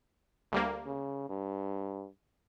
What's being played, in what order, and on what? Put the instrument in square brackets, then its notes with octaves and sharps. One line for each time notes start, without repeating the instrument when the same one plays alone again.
[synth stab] D2 G3 A#3
[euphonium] C#3
G2